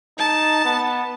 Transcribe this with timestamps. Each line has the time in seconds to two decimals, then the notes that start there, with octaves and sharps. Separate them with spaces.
0.18 D#4 A5
0.65 B3